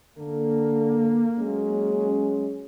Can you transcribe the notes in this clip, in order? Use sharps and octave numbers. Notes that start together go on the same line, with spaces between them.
D3 A#3 A4
F#3 G#3 C#4